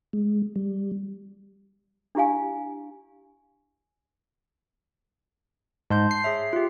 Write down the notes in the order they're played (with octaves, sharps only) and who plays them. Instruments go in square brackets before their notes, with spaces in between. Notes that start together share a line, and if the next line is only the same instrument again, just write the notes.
[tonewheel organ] G#3
G3
[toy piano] D4 E4 G4 F5 G#5
[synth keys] G#2 [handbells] A5 C6 G6
[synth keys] C7
[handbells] G#4 C#5 E5
F4 G4